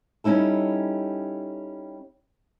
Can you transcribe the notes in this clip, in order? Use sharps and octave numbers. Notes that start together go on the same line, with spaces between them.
G3 C#4 D#4 E4 A4